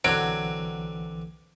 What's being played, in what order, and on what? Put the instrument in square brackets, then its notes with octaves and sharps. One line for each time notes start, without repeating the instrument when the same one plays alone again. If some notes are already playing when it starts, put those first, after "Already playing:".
[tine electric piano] B1 E3 [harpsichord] D3 C4 [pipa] F#3 [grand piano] D7